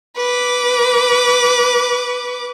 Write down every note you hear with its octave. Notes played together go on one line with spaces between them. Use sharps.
B4 D6